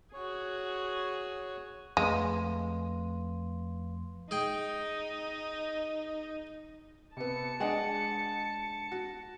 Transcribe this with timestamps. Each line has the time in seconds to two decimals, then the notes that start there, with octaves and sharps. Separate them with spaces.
0.13 F#4 G#4 C#5
1.97 F2 G#3 A3 B4 F5 C6
4.31 D#4 G#4 G5
7.17 C3 B3 A5 C#7
7.60 G#3 D4 D#5 F#5 G#5
8.92 F#4